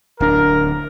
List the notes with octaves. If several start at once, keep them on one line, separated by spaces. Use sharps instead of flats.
D1 D4 A#4